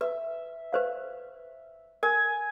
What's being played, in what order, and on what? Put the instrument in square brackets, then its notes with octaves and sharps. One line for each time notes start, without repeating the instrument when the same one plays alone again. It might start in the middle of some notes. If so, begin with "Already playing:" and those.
[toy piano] B4 [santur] E5
[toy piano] B4 C5 F5
[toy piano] A#4 [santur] G#5